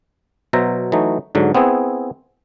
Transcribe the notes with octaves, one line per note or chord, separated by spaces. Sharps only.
B2 F#3 C5 E5 A#5
E3 F#3 A3 D#4
G#2 D3 F#3
B3 C4 E4 G#4